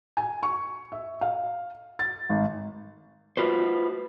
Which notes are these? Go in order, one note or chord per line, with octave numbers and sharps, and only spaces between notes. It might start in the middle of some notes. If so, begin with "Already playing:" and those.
G#5
C#6
E5
F5
A6
G#1
F4 F#4 B4 C5